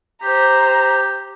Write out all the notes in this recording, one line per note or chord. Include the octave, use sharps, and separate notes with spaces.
G4 C5 A#5